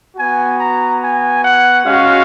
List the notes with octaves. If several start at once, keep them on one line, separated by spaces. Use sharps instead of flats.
B3 F#4 G#5
A#5
G#5
F#5
G#3 C#4 F#4 F5